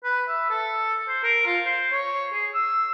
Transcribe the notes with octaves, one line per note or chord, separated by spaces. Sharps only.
B4
E5
A4
C5
A#4
F4
C5
C#5
G#4
E6